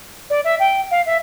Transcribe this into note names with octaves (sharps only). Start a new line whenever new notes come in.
D5
E5
G5
F5
E5